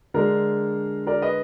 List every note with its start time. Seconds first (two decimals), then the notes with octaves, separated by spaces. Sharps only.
0.14 D3 G#3 D4 A#4
1.07 A#4 D5
1.22 B4 D#5